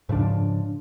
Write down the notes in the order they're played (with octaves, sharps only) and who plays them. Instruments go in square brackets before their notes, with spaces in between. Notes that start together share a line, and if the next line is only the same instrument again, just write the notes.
[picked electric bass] G#2 C#3 F3 D4